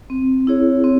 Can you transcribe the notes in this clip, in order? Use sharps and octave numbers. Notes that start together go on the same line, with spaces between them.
C4
E4 G#4 C#5
C4